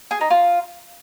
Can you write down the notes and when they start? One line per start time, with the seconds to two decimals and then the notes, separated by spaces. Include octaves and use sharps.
0.11 G#4
0.21 D#4
0.31 F4